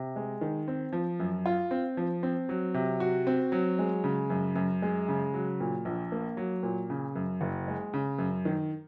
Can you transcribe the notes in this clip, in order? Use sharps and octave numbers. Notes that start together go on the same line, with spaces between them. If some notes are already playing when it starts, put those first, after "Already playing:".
Already playing: C3
G#3
D#3
C4
F3
F#2
F4
C4
F3
C4
F#3
C3
F#4
C4
F#3
G#3
C#3
F#2
F#2
G#3
C#3
F#3
A#2
A#1
A#3
F#3
A#2
C#3
F#2
F#1
G#3
C#3
F#2
D#3